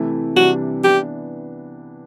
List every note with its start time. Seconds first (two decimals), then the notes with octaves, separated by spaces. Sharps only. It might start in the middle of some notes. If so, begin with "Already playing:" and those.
Already playing: C3 E3 A3 E4
0.36 C3 E3 G3 D4 F#4
0.83 E3 B3 D4 G4